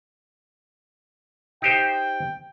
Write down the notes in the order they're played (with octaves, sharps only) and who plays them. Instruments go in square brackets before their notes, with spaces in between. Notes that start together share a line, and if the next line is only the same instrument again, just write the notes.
[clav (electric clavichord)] D#4 G4 C5 [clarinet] G5